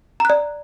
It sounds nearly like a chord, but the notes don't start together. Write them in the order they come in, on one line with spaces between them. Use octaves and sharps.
A#5 F#6 D5